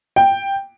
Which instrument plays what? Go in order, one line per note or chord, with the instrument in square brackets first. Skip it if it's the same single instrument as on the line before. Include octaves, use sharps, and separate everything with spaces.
[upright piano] G5